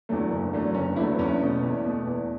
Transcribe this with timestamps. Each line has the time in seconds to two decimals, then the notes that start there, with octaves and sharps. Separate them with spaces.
0.09 E2 D3 F#3 A3
0.31 F#1
0.53 E2 D3 F#3 A3
0.74 F#1 C#4
0.96 E2 D3 F#3 A3 E4
1.12 B3
1.19 E2 C#4
1.41 B2 A3
1.63 E2
1.85 B2 A3
2.07 E2